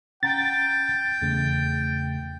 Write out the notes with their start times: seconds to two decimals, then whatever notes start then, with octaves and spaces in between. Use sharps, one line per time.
0.23 C#4 F#5 G5 A#5 A6
1.22 E2 C#3 A3